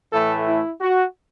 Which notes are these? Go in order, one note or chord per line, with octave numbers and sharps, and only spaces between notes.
A2 E3 A3 A4
E4
F#4